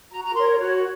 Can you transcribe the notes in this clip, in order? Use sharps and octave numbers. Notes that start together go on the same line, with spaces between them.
F#4 A#5
A#5
A#4 C#5 C6
C#5
F#4 C#5